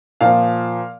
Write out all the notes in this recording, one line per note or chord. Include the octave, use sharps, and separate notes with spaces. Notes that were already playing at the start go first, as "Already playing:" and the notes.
A#2 F3 F5